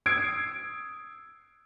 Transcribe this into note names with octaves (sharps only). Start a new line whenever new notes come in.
D#6 E6 G#6 C7 D7